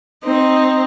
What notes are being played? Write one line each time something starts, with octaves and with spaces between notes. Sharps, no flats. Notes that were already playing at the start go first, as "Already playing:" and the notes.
C4 D#4